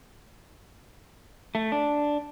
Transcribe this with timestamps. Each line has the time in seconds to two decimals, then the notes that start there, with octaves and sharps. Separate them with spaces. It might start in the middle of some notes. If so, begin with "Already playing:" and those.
1.55 A3
1.72 D4